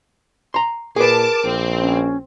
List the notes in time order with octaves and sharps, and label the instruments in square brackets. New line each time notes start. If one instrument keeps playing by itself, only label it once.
[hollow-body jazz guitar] A#5 C6
[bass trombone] A#2 [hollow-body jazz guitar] G#4 B4 [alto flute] A#4 [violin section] A5 D6
[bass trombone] A#1 [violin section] C4
[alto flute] C#4